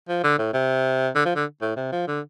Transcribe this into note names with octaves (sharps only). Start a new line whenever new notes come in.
F3
D3
A2
C3
D3
F3
D3
A2
C3
F3
D3